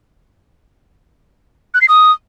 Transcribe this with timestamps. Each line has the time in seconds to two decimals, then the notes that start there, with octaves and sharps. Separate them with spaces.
1.74 F#6
1.81 C7
1.88 D#6